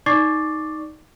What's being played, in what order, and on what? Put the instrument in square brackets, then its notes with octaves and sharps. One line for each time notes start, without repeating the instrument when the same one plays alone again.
[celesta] D#4 D5 C#6 D6 A6 C7